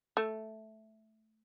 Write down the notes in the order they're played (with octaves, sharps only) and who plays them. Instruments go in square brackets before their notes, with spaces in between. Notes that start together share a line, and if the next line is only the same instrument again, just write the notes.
[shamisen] A3